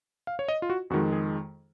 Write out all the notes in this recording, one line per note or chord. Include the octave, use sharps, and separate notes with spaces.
F5
C#5
D#5
F4
F#4
F2 D#3 G#3 F#4
G#4